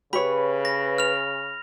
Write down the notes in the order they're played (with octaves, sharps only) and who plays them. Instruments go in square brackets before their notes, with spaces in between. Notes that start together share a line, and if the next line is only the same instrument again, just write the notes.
[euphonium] C#3 [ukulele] G4 C#5 [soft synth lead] B4 [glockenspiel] B5
[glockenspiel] A#6
F6 F7